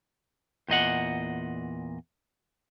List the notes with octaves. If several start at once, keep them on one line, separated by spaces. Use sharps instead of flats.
E2 A#2 D#5 F#5